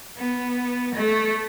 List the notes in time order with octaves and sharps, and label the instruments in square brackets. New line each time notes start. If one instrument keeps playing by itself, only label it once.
[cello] B3
A3